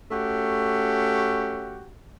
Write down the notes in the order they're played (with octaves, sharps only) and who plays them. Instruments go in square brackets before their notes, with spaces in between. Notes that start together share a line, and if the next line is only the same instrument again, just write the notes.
[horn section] A3 C#4 F#4 G4